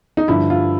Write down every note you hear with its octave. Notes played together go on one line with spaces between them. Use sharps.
D#4
G2 D3 F3 E4
F4